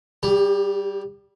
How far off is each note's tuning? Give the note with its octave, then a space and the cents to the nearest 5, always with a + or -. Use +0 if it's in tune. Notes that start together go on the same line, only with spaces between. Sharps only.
G3 -15 G4 +35